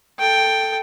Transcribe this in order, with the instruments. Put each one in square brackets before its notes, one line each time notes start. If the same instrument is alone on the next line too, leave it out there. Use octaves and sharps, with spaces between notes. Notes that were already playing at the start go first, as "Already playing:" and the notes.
[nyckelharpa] A4 G5